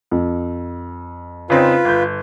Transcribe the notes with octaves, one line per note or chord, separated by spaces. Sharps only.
F2
C#3 C4 D#4 F4 B4
G1 G6